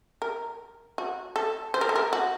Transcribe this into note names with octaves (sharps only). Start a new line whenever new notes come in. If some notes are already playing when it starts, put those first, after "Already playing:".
A#4
F#4
A4
C5
A#4
A4
A#4
F#4